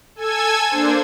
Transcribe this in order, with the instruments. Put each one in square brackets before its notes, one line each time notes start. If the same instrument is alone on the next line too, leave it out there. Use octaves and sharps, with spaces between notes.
[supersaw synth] A4 G#5 E6 G#6
A#3 D4 C5